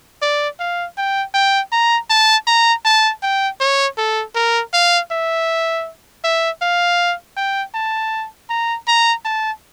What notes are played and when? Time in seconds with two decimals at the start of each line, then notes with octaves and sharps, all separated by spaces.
0.22 D5
0.60 F5
0.97 G5
1.34 G5
1.72 A#5
2.10 A5
2.47 A#5
2.85 A5
3.22 G5
3.60 C#5
3.97 A4
4.35 A#4
4.73 F5
5.11 E5
6.24 E5
6.62 F5
7.37 G5
7.74 A5
8.50 A#5
8.87 A#5
9.25 A5